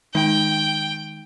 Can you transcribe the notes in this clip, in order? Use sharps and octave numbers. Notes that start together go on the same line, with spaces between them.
D#3 G#3 D#4 G5